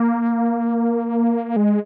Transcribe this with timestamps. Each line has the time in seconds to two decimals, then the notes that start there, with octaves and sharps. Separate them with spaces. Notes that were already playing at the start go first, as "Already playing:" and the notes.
Already playing: A#3
1.56 G#3